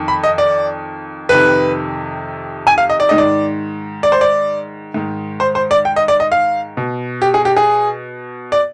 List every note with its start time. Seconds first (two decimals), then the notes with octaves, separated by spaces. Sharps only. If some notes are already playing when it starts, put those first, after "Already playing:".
Already playing: F2 D#3
0.08 B5
0.24 D#5
0.38 D5
1.29 F2 C3 D#3 B4
2.67 G#5
2.78 F5
2.90 D#5
3.00 D5
3.09 G#2 D#3 D#5
3.18 D5
4.03 D5
4.12 C5
4.21 D5
4.94 G#2 D#3
5.40 C5
5.55 C5
5.71 D5
5.85 G5
5.96 D#5
6.08 D5
6.20 D#5
6.32 F5
6.77 B2
7.22 G4
7.34 G#4
7.45 G4
7.56 G#4
8.52 D5